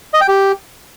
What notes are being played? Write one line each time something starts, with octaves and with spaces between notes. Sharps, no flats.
D#5
G5
G4